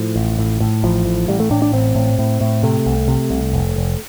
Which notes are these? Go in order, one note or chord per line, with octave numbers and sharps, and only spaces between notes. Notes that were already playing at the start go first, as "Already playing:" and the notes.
Already playing: A2 F3
A1
A2
A2
A1 F3
A2
A1 G3
A3
A2 D4
D4
A1 C4
A2
A2
A2
C3 A3
C2
C3
C2
F1
F1